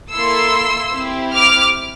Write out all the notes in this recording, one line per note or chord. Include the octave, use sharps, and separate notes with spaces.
A#3 E4 A4 C6 E6
C4 E4 G4
D6 F6